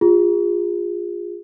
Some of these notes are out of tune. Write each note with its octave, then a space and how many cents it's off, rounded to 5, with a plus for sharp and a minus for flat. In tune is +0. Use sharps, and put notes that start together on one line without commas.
F4 +10 G#4 -30